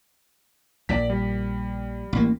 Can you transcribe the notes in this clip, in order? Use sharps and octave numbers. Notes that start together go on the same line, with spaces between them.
A#1 A#2 D5 B6
G3
A1 A#3